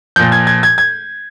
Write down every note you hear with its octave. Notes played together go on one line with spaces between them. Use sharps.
A#2 F3 G6
G#6
G#6
G#6
G#6